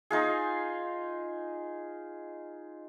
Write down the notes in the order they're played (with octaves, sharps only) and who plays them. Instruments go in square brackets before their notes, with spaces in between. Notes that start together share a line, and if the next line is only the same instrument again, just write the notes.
[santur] D#4 F4 G#4